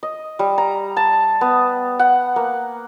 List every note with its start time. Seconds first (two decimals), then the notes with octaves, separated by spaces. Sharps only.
0.03 D#5
0.39 G3
0.58 A#5
0.97 A5
1.41 B3
1.99 F#5
2.36 A#3